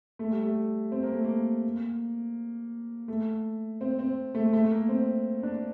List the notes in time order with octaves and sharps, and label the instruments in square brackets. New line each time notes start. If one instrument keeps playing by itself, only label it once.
[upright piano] A3
G3
A3
C4
A#3
A3
A#3
A3
C4
C4
A3
A3
A#3
C4
D4